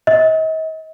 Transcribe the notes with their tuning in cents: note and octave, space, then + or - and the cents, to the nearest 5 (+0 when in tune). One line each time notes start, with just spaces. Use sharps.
D#5 +40